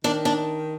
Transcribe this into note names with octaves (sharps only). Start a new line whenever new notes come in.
D#3 D4
D4